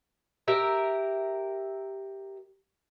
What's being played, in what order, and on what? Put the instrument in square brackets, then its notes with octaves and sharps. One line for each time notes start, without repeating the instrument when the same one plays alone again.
[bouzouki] G4 A#4 E5